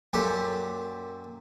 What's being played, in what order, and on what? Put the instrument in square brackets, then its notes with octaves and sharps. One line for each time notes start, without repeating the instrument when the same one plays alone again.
[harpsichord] F#2 A#2 G4 A4